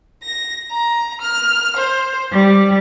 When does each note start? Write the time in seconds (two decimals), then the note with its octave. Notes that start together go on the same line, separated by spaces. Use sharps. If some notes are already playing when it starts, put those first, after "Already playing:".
0.23 A#6
0.72 A#5
1.22 F6
1.76 C5
2.32 G3